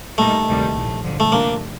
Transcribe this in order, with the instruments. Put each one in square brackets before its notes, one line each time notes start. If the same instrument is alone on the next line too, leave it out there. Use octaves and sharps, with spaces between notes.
[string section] A#2 G3 A#3 D#4 [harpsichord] A3
[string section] D2 C3 D#3 G3
A#1 A2 F3
G1 F2 D3 F3
[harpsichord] A3
[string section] C3 F3 A3 D4 [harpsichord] A#3